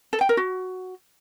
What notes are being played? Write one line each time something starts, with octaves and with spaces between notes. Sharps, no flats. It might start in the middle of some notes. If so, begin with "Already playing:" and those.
A4
G5
A#4
F#4